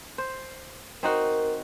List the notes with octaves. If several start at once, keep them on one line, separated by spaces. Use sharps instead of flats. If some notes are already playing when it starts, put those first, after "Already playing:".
C5
C4 D#4 F#4 A#4